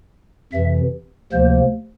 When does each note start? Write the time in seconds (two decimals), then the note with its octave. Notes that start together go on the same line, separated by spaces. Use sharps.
0.53 F2 C3 E3 E5
1.32 D2 C3 F3 A#3 C5